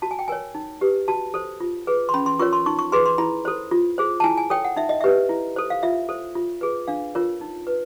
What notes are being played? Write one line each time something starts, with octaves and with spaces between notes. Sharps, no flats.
F#4 A5
G#5
G5
A#4 C#5 G#5
D#4
G4 B4
F#4 A5
A4 C5
F4
G#4 B4
C6
C#4 B5
C6
F4 A#4 C#5 C#6
C6
D#4 C#6
C#6
G#4 B4 C6
C6
E4 B5
A4 C5
F4
G#4 C5
A5
E4 G#5
G#5
A4 C#5 G5
F#5
D#4 E5
D#5
G4 B4 E5
E4
A4 C5
F5
F4 E5
A4 C5
F4
G#4 B4
D4 F5
F4 A#4 C#5
D#4
B4